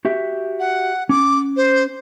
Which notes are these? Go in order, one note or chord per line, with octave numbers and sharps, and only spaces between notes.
F#4 G4 E5
F#5
C#4 D6
C5